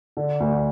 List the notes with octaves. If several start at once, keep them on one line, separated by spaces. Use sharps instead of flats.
D3
D2